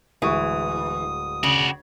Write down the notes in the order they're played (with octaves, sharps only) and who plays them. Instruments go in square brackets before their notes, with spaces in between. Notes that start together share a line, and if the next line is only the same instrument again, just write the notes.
[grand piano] D1 G#3 C#6 [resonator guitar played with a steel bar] E3 [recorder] D#6
[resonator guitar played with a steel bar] C#3 [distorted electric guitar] F#4 D5